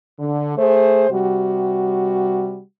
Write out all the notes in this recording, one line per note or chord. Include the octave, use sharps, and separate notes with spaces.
D3
A3 G#4 C5
C3 G3 F#4